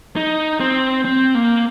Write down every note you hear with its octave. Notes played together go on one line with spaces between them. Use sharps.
D#4
C4
C4
A#3